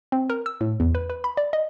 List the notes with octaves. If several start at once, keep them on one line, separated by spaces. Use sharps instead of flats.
C4
A#4
E6
A2
E2
B4
B4
B5
D5
D#5